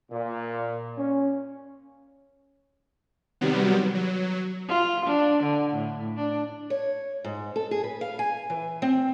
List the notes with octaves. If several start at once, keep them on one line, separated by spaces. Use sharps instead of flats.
A#2
C#4
C3 D#3 F#3 G3 B3
F#3
F4
D4
D3
A2
D4
C#5
G#2
A4
G#4
B4
F5
G#5
E3
C4